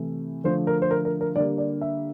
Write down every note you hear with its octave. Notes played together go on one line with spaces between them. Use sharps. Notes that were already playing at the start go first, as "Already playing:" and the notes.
Already playing: C3 E3 A3
D3 F3 A3 C5
A#4
C5
A#4
A#4
A#4
D3 G3 A#3 D5
D5
E5